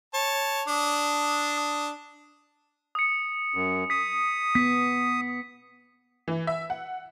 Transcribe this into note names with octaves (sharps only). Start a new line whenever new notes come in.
C#5 A5
D4 D#6
D#6 C#7
F#2
D#6 B6
B3 B6
E3
E5
F#5